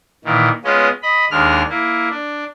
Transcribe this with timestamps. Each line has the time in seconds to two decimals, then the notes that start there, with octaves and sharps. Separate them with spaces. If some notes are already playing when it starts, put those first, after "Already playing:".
0.24 A#2 D#3 E3
0.64 G#3 B3 C#4 F4 D#5
1.02 D#5 B5
1.31 D#2 G#3 D4 F6
1.69 A#3 E4
2.10 D4